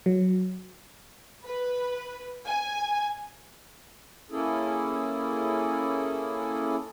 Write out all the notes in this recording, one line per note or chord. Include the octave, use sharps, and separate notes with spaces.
F#3
B4
G#5
A#3 C#4 E4 G#4 A4